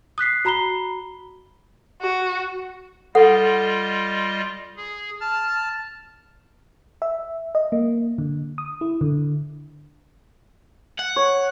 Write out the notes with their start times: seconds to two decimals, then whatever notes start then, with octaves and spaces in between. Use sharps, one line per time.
0.18 D#6 F#6 B6 C7
0.45 F#4 A#5 B5 C7 G7
2.02 F#4
3.15 G3 F4 A4 D#5 F#5
4.77 G#4
5.21 A5 F6 A6
7.02 E5
7.55 D#5
7.72 A#3
8.18 D3
8.58 D#6
8.81 E4
9.01 D3
10.99 F#5
11.16 C#5